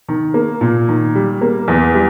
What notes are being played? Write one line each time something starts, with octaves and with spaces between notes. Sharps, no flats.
D#3
A#3
A#2
D#3
G3
A#3
E2
G3